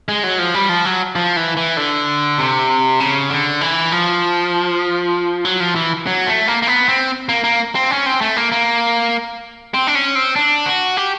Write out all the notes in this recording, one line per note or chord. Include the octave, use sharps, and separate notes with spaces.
G#3
F#3
F3
G3
F3
F#3
F3
E3
E3
D3
C3
C#3
D3
E3
F3
F#3
F3
E3
F#3
A3
A#3
A#3
B3
C4
A#3
A#3
C4
C#4
C4
A3
A#3
A#3
C4
D4
C#4
C4
D4
F#4
G4